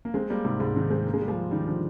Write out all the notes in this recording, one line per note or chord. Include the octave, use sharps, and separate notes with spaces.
A#3
G#3 C4
G3 A#3
G#2 C3
G#2 C3
C3 D#3
G#3 C4
A#3
G#3
G3
F3 G#3
D#3 G3
D3 F3